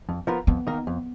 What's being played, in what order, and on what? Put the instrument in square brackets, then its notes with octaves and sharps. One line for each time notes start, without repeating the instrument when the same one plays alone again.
[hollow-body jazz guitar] F2
F3 B3 F4 A#4
[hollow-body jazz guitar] F2 [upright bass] B3
[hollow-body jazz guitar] D#3 A#3 D#4 A#4
F2